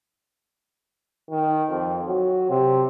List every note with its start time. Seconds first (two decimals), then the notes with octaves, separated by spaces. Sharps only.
1.30 D#3
1.70 F2
2.07 F#3
2.50 C3